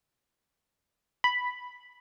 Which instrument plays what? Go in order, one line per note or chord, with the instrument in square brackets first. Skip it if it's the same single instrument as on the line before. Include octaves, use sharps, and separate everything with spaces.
[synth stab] B5